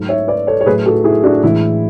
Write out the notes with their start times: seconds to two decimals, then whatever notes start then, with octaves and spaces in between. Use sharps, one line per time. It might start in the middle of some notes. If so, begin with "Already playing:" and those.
Already playing: G#2 F#3 A3
0.09 C#5 E5
0.28 B4 D5
0.47 A4 C#5
0.61 C#5
0.66 A2 F#3 A3 G#4 B4
0.86 F#4 A4
1.04 E4 G#4
1.23 D4 F#4
1.43 A2 E3 G#3 E4